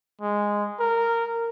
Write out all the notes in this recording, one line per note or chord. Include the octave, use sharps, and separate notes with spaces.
G#3
A#4